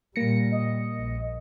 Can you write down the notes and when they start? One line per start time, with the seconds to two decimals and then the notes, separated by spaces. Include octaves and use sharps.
0.16 A#2 G3 A#3 A#6 C#7
0.52 D#5
0.96 A#1